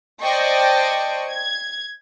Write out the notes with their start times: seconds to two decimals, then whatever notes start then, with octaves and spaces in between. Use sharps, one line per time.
0.22 C5 D5 D#5 G5 A5 C#6
1.29 G#6